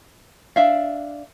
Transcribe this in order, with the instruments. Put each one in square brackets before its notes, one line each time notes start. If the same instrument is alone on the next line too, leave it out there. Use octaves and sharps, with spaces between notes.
[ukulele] D4 E5 F5